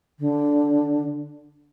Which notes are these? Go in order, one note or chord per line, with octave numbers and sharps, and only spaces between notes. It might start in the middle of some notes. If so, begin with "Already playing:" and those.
D3